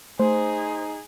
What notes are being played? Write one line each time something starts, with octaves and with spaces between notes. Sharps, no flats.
A3 D#4 G#4 C5